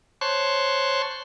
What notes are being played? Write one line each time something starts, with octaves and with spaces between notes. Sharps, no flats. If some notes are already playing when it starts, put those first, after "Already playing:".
C5 C#5 A5 C6 C#6 F#6